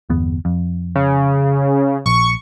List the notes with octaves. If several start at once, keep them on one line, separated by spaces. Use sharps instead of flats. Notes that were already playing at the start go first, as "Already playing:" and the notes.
G1 E2 B3
F2
C#3
A#1 C#6